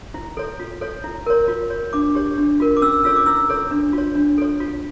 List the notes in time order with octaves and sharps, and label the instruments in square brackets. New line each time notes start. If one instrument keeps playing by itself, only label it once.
[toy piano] E4
A4 C#5
F4
A4 C#5
E4
A#4 C#5
F4
C#5
D4 D6
G4 C#5
D4
F4 A#4
D6
C#4 E6
F4 A4 C#5 E6
D6
E4 E6
A4 C#5
D4
F4 C#5
D4
A4 C#5
F4